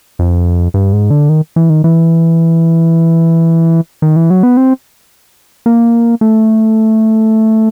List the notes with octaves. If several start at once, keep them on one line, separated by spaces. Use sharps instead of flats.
F2
G2
G#2
D3
D#3
E3
D#3
E3
D#3
E3
F#3
B3
C4
A#3
A3